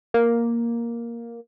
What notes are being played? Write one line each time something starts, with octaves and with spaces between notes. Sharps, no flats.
A#3